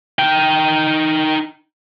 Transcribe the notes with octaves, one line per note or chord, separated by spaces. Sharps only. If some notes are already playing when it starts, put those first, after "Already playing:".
D#4 G5